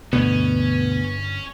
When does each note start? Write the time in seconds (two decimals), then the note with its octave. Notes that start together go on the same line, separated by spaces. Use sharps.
0.13 D2 G2 B2 D3 B3 C#4